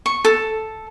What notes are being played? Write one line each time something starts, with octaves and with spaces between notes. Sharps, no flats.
C#6
A4